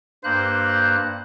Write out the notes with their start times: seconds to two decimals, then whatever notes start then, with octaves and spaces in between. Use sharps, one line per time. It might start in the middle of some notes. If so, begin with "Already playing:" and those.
0.24 G2 A#3 C5 F#6